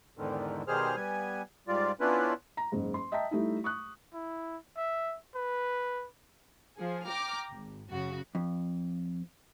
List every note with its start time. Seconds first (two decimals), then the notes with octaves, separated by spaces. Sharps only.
0.17 E2 G#2 D3 D#3
0.68 B2 D#3 G3 G#4 C5 F6
0.96 G3 B3 G#5
1.68 G#2 G3 F4 D5
2.00 B3 C#4 D4 E4 F4 B4
2.57 A#5
2.72 F#1 G#2
2.94 C6
3.12 D#5 E5 G5 A5 A#5 B6
3.31 G3 A3 D#4 E4
3.64 C#6 D#6 F#6
4.14 E4
4.76 E5
5.35 B4
6.78 F3 G#4
7.09 G5 A#5 D6 F6
7.51 G#1
7.91 F#2 C#3 F#4
8.35 F2